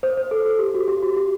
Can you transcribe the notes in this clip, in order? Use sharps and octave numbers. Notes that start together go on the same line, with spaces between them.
C5
C5
A4
A4
G4
F#4
G4
F#4
G4